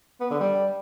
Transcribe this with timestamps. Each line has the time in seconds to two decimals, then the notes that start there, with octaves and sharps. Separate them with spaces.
0.21 B3
0.30 D3
0.40 G3